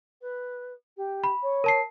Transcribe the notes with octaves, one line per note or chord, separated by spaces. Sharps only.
B4
G4
B5
C#5
A#4 A5 C7